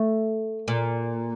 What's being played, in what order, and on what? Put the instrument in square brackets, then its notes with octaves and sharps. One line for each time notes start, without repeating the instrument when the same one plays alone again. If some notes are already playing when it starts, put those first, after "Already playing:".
Already playing: [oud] A3
A#2